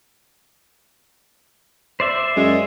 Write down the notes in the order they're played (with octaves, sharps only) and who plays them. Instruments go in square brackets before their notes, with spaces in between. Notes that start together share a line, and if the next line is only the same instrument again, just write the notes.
[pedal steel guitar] C5 D5 E5
[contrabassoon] F#2 [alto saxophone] G#3